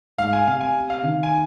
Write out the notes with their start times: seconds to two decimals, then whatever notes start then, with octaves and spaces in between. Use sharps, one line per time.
0.18 G#2 F5
0.33 G#5
0.47 C3 F5
0.61 G#5
0.90 F5
1.04 D#3 F5
1.23 G#5